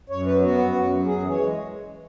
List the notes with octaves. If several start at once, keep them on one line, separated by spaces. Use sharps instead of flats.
F#2 C#5
F#3 B4
B3 F#4
F#2
F#2
F#3
F#2 G#4
E3
C#5
G#3